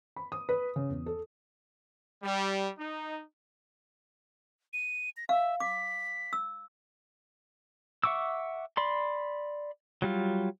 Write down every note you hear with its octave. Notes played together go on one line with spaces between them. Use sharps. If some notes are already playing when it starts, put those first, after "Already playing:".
B5
D#6
B4
C#3
E2
A4
G3
D#4
D#7
A#6
E5 F5
D6 B6
E6
E5 F#5 C#6 D6 E6
D5 B5 C6
F#3 G3 F4